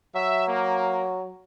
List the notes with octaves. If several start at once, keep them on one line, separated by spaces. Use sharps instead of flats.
F#3 E5
A#3